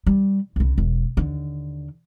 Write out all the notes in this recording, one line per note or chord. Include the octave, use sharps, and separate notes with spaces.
G3
C2 C#3
E1
D#2 D3